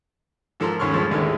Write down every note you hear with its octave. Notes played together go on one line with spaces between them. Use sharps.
G#2 F3 A4 A#4 C6
D#2 G#2 C#4 C6 C#6 F6
G2 F3 G#3
A1 D#2 D3 E3 G#3